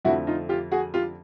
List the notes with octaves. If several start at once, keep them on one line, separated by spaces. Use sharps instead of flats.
F2 D3 F3 A3 E4 F#4
D#4 F4
F4 G4
F#4 G#4
F4 G4